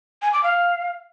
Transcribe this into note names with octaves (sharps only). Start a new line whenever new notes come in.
G#5
D6
F5